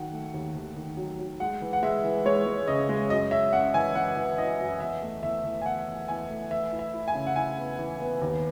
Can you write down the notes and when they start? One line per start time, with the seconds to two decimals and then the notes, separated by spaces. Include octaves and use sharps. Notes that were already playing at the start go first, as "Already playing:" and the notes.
Already playing: D#3 F#3 F#5
0.12 A3
0.34 D#2
0.55 D#2
0.76 D#3
0.97 F#3
1.19 F#3
1.40 G#3 F#5
1.62 E3
1.73 F#5
1.83 G#3 E5
2.04 E3
2.25 G#3 C#5
2.46 G#3
2.67 C#3 D#5
2.89 G#3
3.10 F#2 D#5
3.31 C#4 E5
3.53 C#4 F#5
3.74 E3 G#5
3.95 E3 F#5
4.17 E3
4.38 E3 D#5
4.60 F#2
4.80 E2 E5
5.02 A3
5.23 E2 E5
5.44 E2
5.62 G#5
5.66 E2 F#5
5.87 E2
6.08 E2 G#5
6.29 A3
6.51 E3 E5
6.72 E4
6.79 E5
6.94 E4
7.08 G#5
7.15 C#3
7.27 F#5
7.36 E4 G#5
7.57 B3
7.79 E3
8.00 B3
8.21 D#2